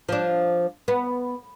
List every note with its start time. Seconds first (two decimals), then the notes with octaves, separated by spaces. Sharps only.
0.09 F3 D4
0.88 B3